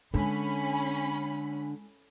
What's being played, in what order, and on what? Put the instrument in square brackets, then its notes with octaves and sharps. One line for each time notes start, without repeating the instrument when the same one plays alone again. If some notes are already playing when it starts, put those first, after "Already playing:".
[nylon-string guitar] D3 [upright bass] G#3 [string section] C#4 B5